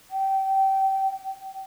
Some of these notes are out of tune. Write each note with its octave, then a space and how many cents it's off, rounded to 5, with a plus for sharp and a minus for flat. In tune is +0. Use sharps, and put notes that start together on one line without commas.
G5 -25